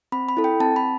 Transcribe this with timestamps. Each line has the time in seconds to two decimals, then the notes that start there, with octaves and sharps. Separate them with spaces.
0.12 C4 B5
0.29 B5
0.37 E4 A4
0.44 G5
0.60 C4 A5
0.76 B5